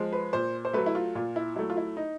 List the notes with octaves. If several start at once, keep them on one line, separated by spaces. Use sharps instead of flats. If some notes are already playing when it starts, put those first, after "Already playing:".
Already playing: F3 G#3
B4
A#2 C5
C5
F#3 A3 B4
E4
F4
A#2 F4
E4
F#3 A3 E4
F4
E4
D#4